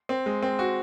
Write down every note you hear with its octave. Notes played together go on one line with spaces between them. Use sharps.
C4
G#3
C4
F#4